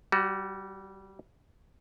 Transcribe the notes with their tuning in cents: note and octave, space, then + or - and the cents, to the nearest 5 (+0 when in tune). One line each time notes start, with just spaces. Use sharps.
G3 -15 F#4 +15